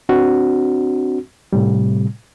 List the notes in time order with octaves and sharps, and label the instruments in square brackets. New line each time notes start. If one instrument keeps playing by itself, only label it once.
[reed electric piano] C4 D4 F#4
A2 C3 G3